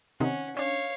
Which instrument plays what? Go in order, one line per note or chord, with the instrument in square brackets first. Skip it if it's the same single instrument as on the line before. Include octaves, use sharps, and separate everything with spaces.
[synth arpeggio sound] C3 D#3 D#4 [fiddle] C#4 F#5
[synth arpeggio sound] C#4 D4 [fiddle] C#5 F5